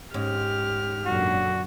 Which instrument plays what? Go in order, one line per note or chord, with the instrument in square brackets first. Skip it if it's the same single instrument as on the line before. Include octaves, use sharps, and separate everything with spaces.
[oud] G#2 C#4 [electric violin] G4 F6
[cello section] F#2 A#2 D3 [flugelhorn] F#4